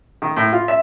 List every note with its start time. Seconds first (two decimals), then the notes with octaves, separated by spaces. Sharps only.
0.22 D#3
0.36 A2
0.52 F4
0.68 E5